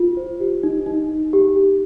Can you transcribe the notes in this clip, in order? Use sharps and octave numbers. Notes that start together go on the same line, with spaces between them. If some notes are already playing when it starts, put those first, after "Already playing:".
Already playing: F4
C5
G4
D#4
D#4
D#4
G4
G4